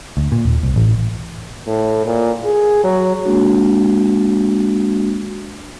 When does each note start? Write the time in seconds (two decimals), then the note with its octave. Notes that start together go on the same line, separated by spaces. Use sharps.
0.17 D2
0.32 A#2
0.45 D#1
0.63 C2
0.76 A1
1.67 A2
2.06 A#2
2.44 G#4
2.84 F#3
3.25 G#3 A#3 D4 F#4